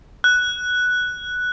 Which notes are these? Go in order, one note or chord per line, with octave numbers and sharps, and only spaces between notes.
F#6